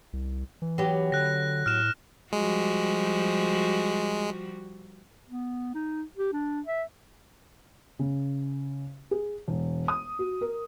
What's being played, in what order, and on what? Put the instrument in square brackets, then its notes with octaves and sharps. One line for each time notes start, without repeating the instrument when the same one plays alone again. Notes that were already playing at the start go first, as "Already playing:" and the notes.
[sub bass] C2
E3
[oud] F#3 B3 G4
[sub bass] D3 [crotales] F#6 A#6
[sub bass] A2 [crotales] F6 E7
[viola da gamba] F3 G3 F#4 [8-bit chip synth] G#3
[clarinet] B3
D#4
G4
D4
E5
[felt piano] C#3
G#4
E1
D#6
F#4
A#4